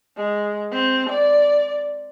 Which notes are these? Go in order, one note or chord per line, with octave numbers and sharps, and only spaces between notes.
G#3
C4
D5